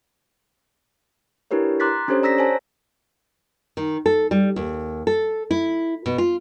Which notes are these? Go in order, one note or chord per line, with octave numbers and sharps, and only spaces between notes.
D4 E4 G4 A#4 B4 C#5
A#5 C6 D6 F#6 A6 B6
C#4 D4 G4 A4 C5 C#5
D5 A#5 E6 A#6 B6
C5 C#5 G#5 A5
D#3
A4
G3
D#2
A4
E4
B2
F4